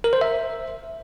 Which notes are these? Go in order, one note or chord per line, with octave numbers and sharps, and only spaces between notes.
A#4
C5
E5